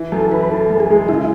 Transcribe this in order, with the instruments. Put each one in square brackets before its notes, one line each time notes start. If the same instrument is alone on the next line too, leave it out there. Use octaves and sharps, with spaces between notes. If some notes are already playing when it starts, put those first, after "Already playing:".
Already playing: [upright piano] E3
[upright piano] F#2 [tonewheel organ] A4
[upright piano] E3 [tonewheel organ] B4
[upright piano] E3 [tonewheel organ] A4
[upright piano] F#2
[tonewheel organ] G#4
[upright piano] G#3
[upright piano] C#3 [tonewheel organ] E4